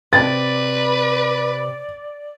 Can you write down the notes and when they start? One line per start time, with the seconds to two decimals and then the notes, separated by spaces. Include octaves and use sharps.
0.13 C3 B4 D5 G5 A6